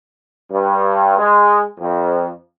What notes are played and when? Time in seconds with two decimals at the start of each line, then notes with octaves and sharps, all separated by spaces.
0.52 G2
1.17 G#3
1.79 F2